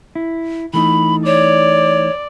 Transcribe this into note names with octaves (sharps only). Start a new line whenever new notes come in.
E4
E3 A3 D#4 B5
C#5 D5